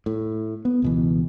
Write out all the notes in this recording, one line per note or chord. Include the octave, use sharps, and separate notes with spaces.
A2
B3
C#2 B2 E3